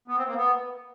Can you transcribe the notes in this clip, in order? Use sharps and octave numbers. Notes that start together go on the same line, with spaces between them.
B3
C4
A#3
B3